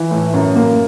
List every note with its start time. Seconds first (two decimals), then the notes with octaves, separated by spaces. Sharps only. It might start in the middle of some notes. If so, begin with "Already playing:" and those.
Already playing: E3
0.11 A2
0.33 F#2
0.55 A#3